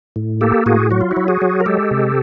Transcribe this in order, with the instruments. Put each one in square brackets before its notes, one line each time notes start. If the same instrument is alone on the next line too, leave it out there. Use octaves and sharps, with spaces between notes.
[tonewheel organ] A2
A#3 G4 A4
A2 F#4 G#4
F#3 F#4
F4
E4 F#4
F#3
F#4 G#4
F#3
A#4
G#3 G4 A4
C3